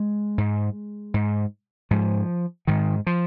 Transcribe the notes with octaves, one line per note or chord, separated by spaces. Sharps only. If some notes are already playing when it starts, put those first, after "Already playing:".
Already playing: G#3
G#2
G#2
G#2 F3
G#2 D#3
F3